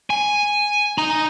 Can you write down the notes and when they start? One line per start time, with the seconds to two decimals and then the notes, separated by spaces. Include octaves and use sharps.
0.10 G#5
0.98 D#4 A#5